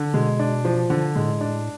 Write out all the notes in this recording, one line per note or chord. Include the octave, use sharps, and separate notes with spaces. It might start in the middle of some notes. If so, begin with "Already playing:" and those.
Already playing: D3
B2 G#3
D4
F3
D3
A2 G#3
D4